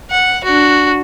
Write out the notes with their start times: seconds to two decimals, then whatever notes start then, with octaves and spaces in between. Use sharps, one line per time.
0.11 F#5
0.44 D4 F#4